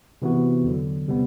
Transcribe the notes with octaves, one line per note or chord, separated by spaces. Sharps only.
C3 E3 B3 F#4
E2 D3 F#3
C3 G3 B3